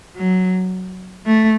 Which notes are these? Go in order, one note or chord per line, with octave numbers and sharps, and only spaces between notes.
F#3
A3